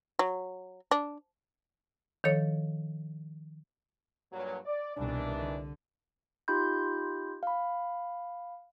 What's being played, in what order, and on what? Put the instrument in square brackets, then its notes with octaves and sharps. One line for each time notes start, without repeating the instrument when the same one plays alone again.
[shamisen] F#3
D4
[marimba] D#3 F3 A4 C#5
[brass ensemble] G2 A#2 F#3
D5
[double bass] C2 B2 [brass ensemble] D#3 E3 D4
[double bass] D3
[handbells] D#4 F4 G4 B5 C6 G6
F5 B5